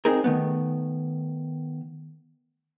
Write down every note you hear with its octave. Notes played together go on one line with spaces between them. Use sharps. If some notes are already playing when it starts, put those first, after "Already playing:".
C4 D#4 G#4 A#4
D#3 A3 B3